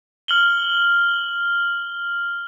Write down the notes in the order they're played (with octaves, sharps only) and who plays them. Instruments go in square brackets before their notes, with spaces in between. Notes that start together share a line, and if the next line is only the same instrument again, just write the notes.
[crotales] F6 F#7 G7